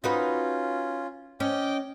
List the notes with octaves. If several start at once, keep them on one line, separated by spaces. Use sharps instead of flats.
C#4 D#4 F4 F#4 B4
C#4 D#5 G5 D6